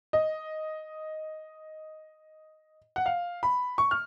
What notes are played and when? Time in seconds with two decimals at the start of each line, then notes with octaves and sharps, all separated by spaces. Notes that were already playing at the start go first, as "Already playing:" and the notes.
0.13 D#5
2.96 F#5
3.06 F5
3.43 B5
3.78 C#6
3.91 F6